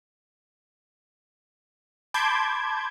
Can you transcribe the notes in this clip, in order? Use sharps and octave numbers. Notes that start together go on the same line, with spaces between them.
A5 B5 C6 D6 G6 G#6